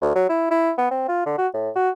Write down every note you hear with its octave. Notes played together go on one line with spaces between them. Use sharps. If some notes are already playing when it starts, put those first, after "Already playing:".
D2
F#3
E4
E4
B3
C4
F4
D3
F#4
A2
F#4